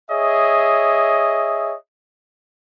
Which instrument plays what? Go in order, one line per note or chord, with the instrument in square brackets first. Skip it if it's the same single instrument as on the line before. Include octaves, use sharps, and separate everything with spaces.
[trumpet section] G#4 C#5 D#5 E5